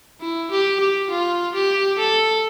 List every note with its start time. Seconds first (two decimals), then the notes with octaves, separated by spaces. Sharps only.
0.21 E4
0.51 G4
0.80 G4
1.10 F4
1.54 G4
1.98 A4